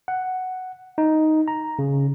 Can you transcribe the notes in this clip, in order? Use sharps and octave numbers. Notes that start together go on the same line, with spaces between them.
F#5
D#4
A#5
C#3